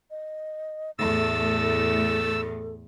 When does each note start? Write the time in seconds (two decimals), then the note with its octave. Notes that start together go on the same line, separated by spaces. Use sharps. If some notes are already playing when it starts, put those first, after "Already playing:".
0.11 D#5
0.99 E2 A2 A3 A4 E6 A6